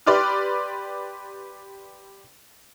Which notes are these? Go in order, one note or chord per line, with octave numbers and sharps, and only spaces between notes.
G4 B4 D5 C6 D6 F6